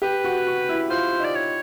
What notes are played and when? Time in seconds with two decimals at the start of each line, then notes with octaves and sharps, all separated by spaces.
0.02 G4 B4
0.24 F#4
0.47 F#4
0.69 E4
0.90 F4 C5
1.20 D#4 D5
1.35 C#5